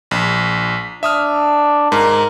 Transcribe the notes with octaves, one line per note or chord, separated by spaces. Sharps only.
A#1
D4 E5 D#6 F6
G#2 A#4